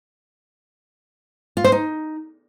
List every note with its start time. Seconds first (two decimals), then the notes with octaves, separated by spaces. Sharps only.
1.57 F4
1.64 C5
1.72 D#4